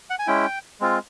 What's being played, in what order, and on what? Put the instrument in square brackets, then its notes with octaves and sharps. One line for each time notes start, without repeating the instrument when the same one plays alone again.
[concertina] F#5
G#5
G#3 C#4 E4 G5
G#3 C4 F4